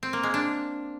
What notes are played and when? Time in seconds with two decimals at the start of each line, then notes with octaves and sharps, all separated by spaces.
0.03 C4
0.13 A#3
0.23 G#3
0.34 D4